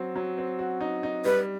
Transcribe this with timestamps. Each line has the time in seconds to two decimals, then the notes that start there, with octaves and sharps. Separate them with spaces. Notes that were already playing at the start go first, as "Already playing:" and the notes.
Already playing: F#3 C4 F#4
0.16 F#3
0.38 C4
0.59 F#4
0.81 D#4
1.03 D#4
1.25 G3 B4